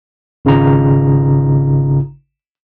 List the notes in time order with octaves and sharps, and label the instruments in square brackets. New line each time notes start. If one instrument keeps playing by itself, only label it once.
[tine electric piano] G#1 C#3 D#4 F4 A#5